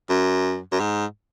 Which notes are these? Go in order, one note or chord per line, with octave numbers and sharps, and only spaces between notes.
F#2
F#2
G#2